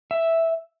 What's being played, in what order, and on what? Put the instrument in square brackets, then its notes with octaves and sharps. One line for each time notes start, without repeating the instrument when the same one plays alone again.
[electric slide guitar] E5